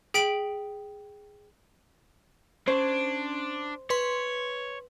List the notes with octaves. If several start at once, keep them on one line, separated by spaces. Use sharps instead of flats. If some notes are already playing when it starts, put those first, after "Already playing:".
G#4 G5 B6 D7 F#7
C#4 D4 C5
B4 C#5 C6